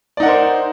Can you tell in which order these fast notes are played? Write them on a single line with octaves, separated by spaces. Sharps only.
D5 D#4 F#5 A#4 C5